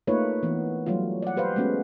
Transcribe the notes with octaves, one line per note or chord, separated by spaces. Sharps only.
A3 A#3 D#4 F4 B4 C#5
E3 B3
F#3 G3 A3 F4
D5 F#5
G4 B4 C5 F5
G#3 A3 B3 C#4 F#4